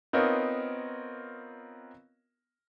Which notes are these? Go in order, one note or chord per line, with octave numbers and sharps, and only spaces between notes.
B3 C4 D#4 F4 A#4 C#5